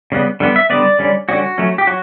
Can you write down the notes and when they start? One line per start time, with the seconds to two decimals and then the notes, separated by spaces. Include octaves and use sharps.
0.12 C#3 G3 B3
0.40 D3 G3 B3
0.56 E5
0.70 D3 G3 B3 D5
0.99 D3 G3 C#4
1.29 D3 G3 C#4 F#4
1.58 F#3 A3 C#4
1.78 G4
1.87 F#3 F#4